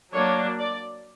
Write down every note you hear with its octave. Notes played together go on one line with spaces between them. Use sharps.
F#3 A#3 D4 C#5
D5